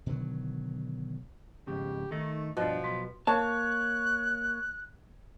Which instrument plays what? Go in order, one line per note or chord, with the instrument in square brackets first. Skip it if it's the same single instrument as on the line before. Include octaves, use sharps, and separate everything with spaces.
[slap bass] B2 D3 D#3 F#3
[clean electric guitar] F2 G#2 C#3 [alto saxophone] G4
[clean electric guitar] D#3 D#4 [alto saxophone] A3
[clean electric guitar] G2 D4 [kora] B2 [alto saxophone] F3
[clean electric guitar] B1 B4 C6
[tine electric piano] A#3 [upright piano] C#5 [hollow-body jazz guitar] A5 [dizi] F#6